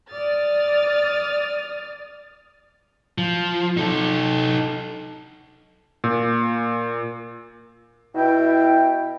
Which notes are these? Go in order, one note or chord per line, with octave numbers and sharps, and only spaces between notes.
D5 D#6 F6 A6
F3
D#4 A4
A#2
B2 E4 G5